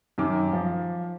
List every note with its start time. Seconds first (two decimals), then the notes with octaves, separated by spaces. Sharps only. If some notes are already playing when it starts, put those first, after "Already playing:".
0.18 F#2 D#3 D6
0.53 F3